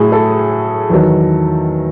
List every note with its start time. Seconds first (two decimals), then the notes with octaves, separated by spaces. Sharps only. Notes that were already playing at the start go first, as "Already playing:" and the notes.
Already playing: A2 F#3 G#4
0.12 A4
0.90 E2 D#3 F#3